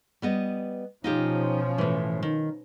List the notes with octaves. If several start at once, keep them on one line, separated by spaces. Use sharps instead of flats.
G3 B3 D#5
B2 F3 C#4 D#4 F4 G4
A2 E3
D#3